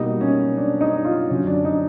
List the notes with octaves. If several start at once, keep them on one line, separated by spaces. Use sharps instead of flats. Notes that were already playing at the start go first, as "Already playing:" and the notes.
Already playing: B2 G3 A#3 D#4
C#4
D4
D#4
F4
F#2 D3 F#3 C#4
D4
D#4